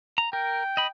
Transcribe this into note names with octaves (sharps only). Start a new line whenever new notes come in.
A#5
A#4 G5
D#5 B5